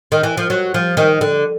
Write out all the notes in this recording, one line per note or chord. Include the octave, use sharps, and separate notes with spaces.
D#3
E3
F3
F#3
F3
D#3
D3